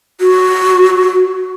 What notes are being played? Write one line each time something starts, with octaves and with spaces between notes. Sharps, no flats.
F#4